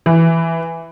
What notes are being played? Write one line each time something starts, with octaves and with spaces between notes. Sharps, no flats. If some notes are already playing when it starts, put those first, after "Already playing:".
E3